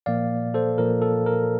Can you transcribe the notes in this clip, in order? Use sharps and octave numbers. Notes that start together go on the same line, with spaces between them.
A#2 F3 A#3 D5 F5
A4 C5
A#2 F3 A#3 A#4
A4
A#4